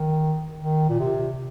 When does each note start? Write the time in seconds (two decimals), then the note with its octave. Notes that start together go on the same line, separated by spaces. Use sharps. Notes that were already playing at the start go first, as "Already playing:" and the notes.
Already playing: D#3
0.58 D#3
0.89 A#2
0.99 C3